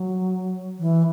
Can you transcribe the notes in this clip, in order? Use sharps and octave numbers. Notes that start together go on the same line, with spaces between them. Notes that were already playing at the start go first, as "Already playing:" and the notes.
Already playing: F#3
E3